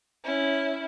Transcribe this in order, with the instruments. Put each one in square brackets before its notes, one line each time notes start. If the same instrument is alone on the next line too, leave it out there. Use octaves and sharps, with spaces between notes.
[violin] C#4 E4